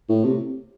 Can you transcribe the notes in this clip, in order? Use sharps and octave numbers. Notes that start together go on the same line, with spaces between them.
A2
C3